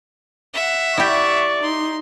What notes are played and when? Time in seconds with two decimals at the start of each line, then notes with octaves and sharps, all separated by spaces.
0.54 E5 F#5
0.98 E4 G4 D5 C#6
1.63 D#4 C6